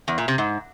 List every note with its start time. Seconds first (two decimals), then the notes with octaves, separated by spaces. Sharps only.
0.08 E2
0.18 A#2
0.28 C3
0.38 G#2